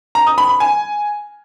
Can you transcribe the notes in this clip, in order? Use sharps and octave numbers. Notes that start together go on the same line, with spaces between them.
A#5
D#6
B5
B5
G#5